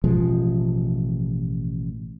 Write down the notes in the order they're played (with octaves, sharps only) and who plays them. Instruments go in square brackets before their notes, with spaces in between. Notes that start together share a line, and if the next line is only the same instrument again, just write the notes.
[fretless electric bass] A1 B2 F3 G#3